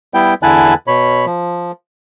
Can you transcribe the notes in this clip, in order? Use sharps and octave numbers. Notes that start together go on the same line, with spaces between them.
G3 B3 E4 G5
E2 D3 E4 G#5 A5 F#6
B2 C#5 B5
F3